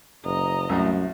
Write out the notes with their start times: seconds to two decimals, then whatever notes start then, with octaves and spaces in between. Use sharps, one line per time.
0.24 F#1 D#5 A#5
0.69 C2 F#2 A2